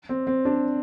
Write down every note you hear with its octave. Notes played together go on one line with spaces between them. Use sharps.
C4
C4
D4